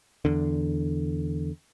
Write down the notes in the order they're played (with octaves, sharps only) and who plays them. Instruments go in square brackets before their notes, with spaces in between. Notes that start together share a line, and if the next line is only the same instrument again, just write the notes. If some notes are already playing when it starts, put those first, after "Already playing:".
[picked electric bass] E2 D3